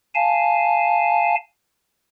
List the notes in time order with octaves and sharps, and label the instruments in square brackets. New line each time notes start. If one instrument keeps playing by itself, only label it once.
[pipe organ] F5 G#5 A5